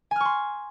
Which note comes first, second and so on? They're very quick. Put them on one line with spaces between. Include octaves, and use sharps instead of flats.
G#5 F6 C#6 C6